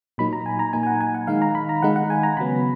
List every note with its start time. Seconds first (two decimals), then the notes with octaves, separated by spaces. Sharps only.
0.18 A#2 F#3 A#3 D#4 B5
0.33 A#5
0.46 G#5
0.59 A#5
0.73 A#2 F#3 A#3 D#4 G#5
0.83 G#5
0.87 F#5
1.01 G#5
1.14 F#5
1.27 D#3 G#3 D#4 F5
1.42 A#5
1.55 B5
1.69 A#5
1.82 D#3 G#3 D#4 F#5
1.96 F#5
2.10 G#5
2.23 A#5
2.37 C#3 F#3 B3 B5